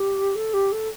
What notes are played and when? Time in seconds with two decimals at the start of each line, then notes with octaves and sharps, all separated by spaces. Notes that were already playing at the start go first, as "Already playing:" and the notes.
Already playing: G4
0.35 A4
0.53 G4
0.72 A4